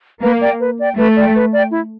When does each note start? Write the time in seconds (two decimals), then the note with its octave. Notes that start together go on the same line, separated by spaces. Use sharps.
0.21 A#3 B4
0.40 D5 G5
0.59 B4
0.78 D5 G5
0.97 A3 B4
1.15 D5 G5
1.34 B4
1.52 D5 G5
1.70 E4